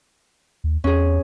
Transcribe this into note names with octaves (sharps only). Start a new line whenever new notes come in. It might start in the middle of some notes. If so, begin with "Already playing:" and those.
D#2
E2 C#4 G#4